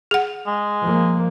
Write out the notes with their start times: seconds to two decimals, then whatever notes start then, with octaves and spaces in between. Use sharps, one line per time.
0.11 G#4 F#5
0.47 G#3
0.81 F3 A#3